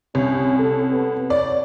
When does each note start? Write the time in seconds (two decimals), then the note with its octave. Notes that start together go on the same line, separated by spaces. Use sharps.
0.15 C2 C#4
0.59 A4
0.92 B3
1.30 C#5 D5